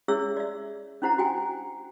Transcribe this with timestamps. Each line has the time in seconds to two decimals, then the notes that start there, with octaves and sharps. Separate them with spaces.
0.08 C#4 E4 G#4 C#5 E5 E6
0.37 D5 E5
1.02 C#4 D4 E4 C5 F#5 A#5
1.18 F#4 G5 G#5